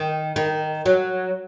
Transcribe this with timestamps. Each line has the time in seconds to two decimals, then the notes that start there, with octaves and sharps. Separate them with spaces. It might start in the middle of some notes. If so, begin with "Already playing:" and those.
Already playing: D#3
0.36 D#3
0.86 F#3